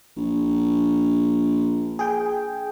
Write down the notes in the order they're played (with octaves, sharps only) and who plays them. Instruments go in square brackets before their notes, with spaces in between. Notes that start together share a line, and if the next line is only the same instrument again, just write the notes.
[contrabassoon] A#1
[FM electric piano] G#4 G5